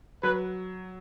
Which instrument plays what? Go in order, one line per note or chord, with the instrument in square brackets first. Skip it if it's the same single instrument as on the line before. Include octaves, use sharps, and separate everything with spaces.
[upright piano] F#3 [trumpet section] B4